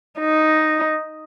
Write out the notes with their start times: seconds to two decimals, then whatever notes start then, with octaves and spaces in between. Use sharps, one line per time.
0.20 D#4